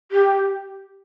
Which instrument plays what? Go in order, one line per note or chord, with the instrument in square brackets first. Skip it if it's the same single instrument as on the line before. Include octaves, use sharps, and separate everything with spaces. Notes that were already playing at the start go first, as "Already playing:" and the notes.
[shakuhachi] G4